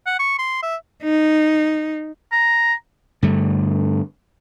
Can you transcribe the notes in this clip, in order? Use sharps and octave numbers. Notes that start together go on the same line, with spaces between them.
F#5
C#6
C6
E5
D#4
A#5
G2 D3 A3